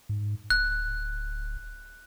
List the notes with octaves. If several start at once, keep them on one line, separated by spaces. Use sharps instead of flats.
G#2
D1 F#6